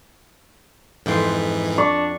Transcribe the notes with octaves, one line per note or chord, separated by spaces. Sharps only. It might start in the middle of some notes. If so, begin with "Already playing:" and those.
F2 G#2 E3 G5 C6
D4 C#6